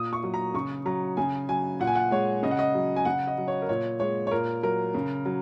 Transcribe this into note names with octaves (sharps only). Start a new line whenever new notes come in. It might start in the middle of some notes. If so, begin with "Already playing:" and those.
Already playing: A#2 D#6
C#6
F#3
A#5
C#3 C#6
F#3 A#5
C#3 G#5
F#3 G#5
A#2 F#5
G#5
F#5
G#3 C#5
C#3 D#5
F#5
D#5
F#3
G#5
C#3 F#5
D#5
F#3
C#5
A#4
A#2 C#5
G#3 C#5
C#5
A#2 A#4
F#3 A#4
C#3
F#3